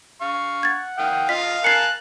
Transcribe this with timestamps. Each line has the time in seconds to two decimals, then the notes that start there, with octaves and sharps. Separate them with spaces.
0.21 F5 C#6
0.63 F#5 G#6 A6
0.98 F5 G5 D#6
1.29 F4 D#5 F5 B6
1.64 A#4 G#5 A5 F#6 C7 C#7